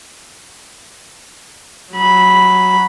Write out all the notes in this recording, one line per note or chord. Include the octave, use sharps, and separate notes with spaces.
F#3 B5